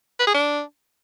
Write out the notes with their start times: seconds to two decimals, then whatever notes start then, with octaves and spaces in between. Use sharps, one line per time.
0.19 B4
0.27 G#4
0.34 D4